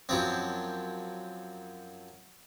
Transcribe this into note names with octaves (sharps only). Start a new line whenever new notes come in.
F#2 F3 C4